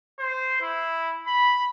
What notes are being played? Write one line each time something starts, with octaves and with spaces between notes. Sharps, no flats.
C5
E4
B5